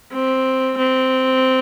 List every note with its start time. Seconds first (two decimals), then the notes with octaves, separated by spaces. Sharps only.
0.13 C4
0.78 C4